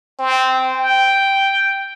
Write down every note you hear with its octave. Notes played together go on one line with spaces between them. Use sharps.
C4
G5